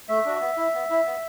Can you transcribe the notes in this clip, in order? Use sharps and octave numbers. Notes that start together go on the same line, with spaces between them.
A3 E5
D4 F#4
B3
E4
B3
E4
B3